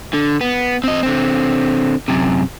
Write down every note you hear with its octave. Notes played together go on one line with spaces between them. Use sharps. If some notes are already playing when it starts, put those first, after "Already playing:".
D3
B3
C4 D#5
D3 C4
F#2 C3